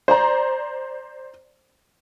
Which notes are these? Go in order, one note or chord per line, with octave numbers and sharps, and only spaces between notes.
C5 D5 A#5